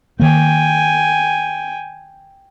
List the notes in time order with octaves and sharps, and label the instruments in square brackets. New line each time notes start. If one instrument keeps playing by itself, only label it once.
[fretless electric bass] D#3 A#3 [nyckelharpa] G5 G#5